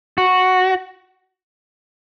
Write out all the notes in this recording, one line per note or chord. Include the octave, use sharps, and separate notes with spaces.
F#4